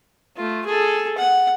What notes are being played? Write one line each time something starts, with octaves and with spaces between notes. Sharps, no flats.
A3 F4
G#4 A4
F#5